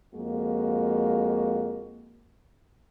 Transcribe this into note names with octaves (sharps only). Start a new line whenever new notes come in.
F2 G#3 A#3 F#4